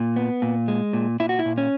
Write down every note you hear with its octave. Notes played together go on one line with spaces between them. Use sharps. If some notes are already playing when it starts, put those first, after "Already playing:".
Already playing: A#2
B3
A#2
G#3
A#2
A#2 E4
F#4
E4
A#2
C#4